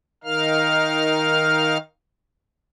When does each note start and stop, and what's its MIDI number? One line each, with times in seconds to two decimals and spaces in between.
0.24 1.77 51
0.24 1.77 63
0.24 1.77 70
0.24 1.77 77
0.24 1.77 89